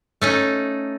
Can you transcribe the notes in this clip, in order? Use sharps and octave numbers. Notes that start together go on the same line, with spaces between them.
A3 C#4 D#4